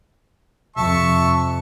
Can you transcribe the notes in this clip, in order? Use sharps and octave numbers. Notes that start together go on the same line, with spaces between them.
F2 C3 E5 A5 C#6